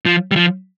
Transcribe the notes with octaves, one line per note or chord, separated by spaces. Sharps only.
F3
G3
F3